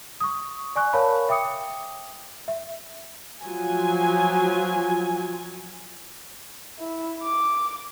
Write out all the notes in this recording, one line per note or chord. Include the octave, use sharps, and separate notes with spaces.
C#6 D#6
D5 G#5 C#6 F#6
A#4 C#5 F5 A5 B5
E5 G5 D6 D#6 C#7
E5
F3 F#3 F4 G#5
E4
D6